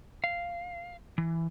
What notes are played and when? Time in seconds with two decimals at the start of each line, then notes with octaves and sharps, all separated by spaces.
0.24 F5
1.18 E3